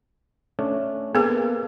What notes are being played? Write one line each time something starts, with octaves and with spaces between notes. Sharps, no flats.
A3 C#4 D4
A#3 B3 G#4 A4 B4